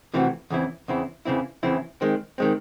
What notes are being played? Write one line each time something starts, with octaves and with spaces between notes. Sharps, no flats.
C3 E3 A3 C4 F#4
E2 C#3 E3 C4 E4
E2 C#3 E3 C4 E4
E2 C#3 E3 C4 E4
E2 C#3 E3 C4 E4
D#3 G#3 C4
D#3 G#3 C4